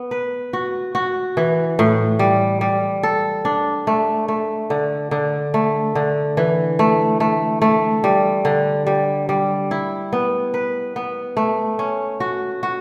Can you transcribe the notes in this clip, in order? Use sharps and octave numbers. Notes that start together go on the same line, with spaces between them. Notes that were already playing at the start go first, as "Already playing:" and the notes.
Already playing: B3
B4
F#4
F#4
E3
A2
G3
G3
A4
D4
A3
A3
D3
D3
A3
D3
E3
A3
A3
A3
G3
D3
G3
G3
E4
B3
B4
B3
A3
C#4
F#4
F#4